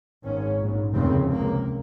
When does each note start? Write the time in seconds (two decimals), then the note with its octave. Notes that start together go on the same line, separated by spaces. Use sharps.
0.24 G#1 G#2 C#4
0.59 A#1 G#2
0.94 F1 D#2 C#3 C4
1.29 C#2 C3 A#3